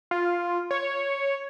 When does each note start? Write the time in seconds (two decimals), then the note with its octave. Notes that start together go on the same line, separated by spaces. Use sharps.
0.11 F4
0.71 C#5